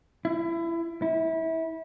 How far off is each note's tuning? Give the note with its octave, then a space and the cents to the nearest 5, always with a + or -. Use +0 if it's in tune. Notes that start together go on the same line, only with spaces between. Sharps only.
E4 +25
E4 -25